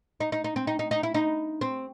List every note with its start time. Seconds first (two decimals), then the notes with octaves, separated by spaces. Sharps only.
0.20 D#4
0.32 D#4
0.44 D#4
0.56 C4
0.67 D#4
0.79 D#4
0.91 D#4
1.03 E4
1.14 D#4
1.61 C4